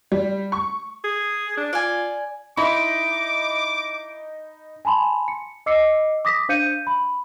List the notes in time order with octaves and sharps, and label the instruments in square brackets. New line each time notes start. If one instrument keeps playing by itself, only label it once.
[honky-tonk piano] G3
C#6
[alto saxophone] G#4
D4
[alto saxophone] F4 [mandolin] D5 G#5
[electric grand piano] D#4 D#5 B5 [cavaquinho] E4 C6 [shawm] D6
[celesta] G#5 A5 B5 C6
C#7
D#5 D6 E6 C7 C#7
D6 D#6 A#6 B6
D4 C5 F5 G6 C#7 D#7
B5